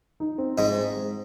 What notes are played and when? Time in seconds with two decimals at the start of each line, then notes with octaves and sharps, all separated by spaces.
0.20 D#4
0.38 C4
0.58 G#2 G#3 D#4
0.77 C4
0.96 G#3